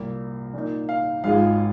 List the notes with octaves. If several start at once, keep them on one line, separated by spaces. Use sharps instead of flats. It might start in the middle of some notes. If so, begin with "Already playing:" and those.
Already playing: C2 A#2 A#3
A#2 A#3 D#4
F5
G#1 G#2 G#3 F4 F5